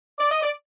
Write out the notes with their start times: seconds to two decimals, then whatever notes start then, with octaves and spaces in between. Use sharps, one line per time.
0.18 D5
0.30 D#5
0.41 D5